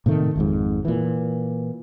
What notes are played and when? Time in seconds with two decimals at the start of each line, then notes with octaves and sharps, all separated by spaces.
0.06 A2 C3 D#3 A3
0.36 G#1 F2 G#2
0.85 A#2 E3